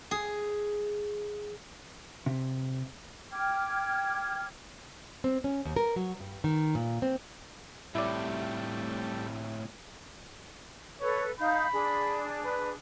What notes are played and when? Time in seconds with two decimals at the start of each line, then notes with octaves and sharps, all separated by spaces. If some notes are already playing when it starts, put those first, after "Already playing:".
0.11 G#4
2.26 C3
3.32 G5 D6 F6 G#6
5.24 C4
5.44 C#4
5.65 D#2
5.76 A#4
5.96 F#3
6.20 G2
6.44 D#3
6.75 A#2
7.02 C4
7.95 A2 C3 G3 A3 E4 D5
11.01 A4 B4 C#5
11.39 D#4 F5 B5 G6
11.72 D4 G#4
12.45 B4